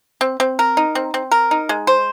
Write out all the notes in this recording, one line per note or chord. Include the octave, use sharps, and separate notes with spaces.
C4
C4
A#4
D#4
C4
C4
A#4
D#4
G#3
C5